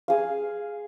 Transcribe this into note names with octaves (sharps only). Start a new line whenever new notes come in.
G#4 F5